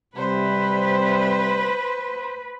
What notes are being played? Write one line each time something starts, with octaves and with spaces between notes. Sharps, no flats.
C3 G3 B4 C5